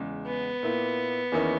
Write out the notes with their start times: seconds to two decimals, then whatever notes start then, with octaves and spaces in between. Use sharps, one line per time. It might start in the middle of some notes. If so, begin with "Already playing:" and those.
Already playing: E2 C#3 G#3
0.27 B3
0.63 A#2 A#3 E4
1.32 E2 D#3 A#3 C#4 E4